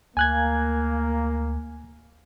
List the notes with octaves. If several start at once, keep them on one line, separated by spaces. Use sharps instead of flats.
D2 A#3 G#5 F#6 G#6